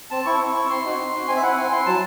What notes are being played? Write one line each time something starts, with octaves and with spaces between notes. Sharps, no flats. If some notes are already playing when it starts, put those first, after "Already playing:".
C4 A5
E4 C#6
C4
E4 C#6
C4 C6
D#4 F#4
C4
D#4 F#4
C4 G#5
E5
E4 F#5
C4 G#5
E4 C6
F#3 A5